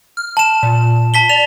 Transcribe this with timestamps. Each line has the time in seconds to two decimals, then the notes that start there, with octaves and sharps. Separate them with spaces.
0.17 F6
0.37 A5 E7
0.63 A#2
1.14 A5 B6 G7
1.29 D5 F7